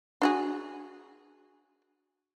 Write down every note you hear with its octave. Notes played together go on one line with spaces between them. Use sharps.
D4 F#4 G#4